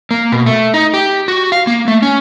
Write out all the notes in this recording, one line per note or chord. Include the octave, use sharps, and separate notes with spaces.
A#3
B2
A3
D#4
G4
F#4
F5
A#3
A3
C#4